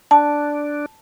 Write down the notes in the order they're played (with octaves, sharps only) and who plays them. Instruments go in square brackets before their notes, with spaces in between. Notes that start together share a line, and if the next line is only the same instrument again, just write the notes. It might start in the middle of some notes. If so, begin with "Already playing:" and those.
[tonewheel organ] D4 [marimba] A5